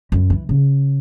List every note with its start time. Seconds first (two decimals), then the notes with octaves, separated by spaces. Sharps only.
0.12 F#2
0.30 E3
0.49 C#3